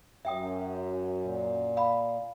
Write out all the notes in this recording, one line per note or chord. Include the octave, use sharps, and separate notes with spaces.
F#2 E5 G5 D#6
A#2
F5 B5